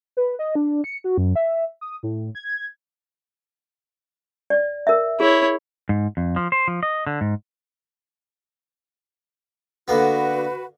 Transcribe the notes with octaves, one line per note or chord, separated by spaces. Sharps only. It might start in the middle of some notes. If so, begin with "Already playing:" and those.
B4
D#5
D4
C#7
F#4
F#2
E5
D#6
A2
G#6
D5
A#4 E5
E4 G#4 C#5
G#2
F2
F3
C5
F3
D#5
D3
G#2
D3 A#3 B3 F#4 B4